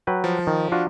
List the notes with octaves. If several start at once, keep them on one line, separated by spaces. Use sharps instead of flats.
F#3 B4 G5
F3
D#3
D4 F4 F#4